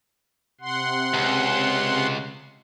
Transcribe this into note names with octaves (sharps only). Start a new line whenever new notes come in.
C3 F#5 C6
C#2